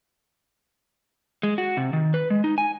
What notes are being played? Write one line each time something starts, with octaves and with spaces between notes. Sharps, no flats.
G#3
F#4
C3
D#3
B4
G#3
D#4
G#5